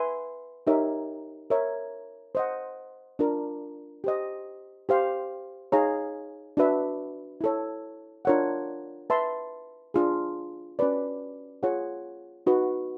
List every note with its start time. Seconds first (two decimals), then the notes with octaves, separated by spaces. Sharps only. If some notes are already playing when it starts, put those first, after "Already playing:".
Already playing: B4 E5 G#5 C6
0.67 D#4 G4 A#4 C#5 E5
1.50 A#4 C#5 E5
2.35 C5 D#5 F#5
3.19 D4 F4 A#4
4.04 G4 C5 D#5
4.89 G4 C5 F5
5.72 D#4 G#4 C#5 F5 A#5
6.57 D4 F#4 B4 E5
7.41 E4 A4 C#5
8.25 D4 F4 A#4 C#5 F#5
9.10 B4 E5 A5 C6
9.94 D4 F4 G#4
10.79 C#4 F#4 B4 D5
11.63 F4 G#4 C#5 F#5
12.46 D#4 F#4 B4